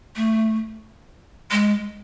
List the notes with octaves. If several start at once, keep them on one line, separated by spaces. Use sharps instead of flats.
A3
G#3